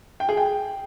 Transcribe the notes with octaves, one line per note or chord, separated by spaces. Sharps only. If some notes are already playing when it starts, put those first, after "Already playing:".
G5
G#4
G5